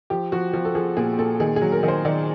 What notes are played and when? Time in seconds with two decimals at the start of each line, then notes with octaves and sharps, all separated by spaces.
0.10 F3 G4
0.32 F3 F#4
0.54 F3
0.65 A4
0.75 F3 G#4
0.97 A#2 G#4
1.18 A#2 A4
1.40 D#3 G#4
1.56 G#4
1.62 F#3
1.72 A#4
1.83 D#3
1.88 C5
2.05 D#3 D5